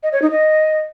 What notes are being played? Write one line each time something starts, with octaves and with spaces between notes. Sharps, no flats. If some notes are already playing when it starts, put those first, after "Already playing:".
D#5
C#5
D#4
D#5